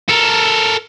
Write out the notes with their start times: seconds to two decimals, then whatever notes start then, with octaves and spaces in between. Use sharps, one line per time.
0.09 A4 A#4